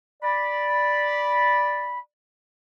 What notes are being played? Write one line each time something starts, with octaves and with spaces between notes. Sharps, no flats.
D5 B5